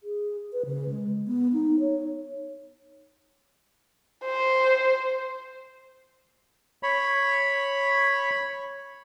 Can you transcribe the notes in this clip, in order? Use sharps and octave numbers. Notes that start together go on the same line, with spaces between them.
G#4
B4
C#3
G#3
B3
D#4
C#5
C5
C#5 B5